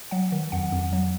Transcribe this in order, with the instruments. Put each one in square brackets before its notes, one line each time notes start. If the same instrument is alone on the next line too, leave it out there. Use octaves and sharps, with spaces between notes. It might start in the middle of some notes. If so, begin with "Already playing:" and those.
[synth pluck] F#3 F#5
D#3
F2 F#5
F2
F#3